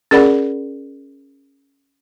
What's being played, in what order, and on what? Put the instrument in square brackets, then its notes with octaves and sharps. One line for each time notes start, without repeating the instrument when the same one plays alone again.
[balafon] C#4 G#4 A#4 D5 F#5 B5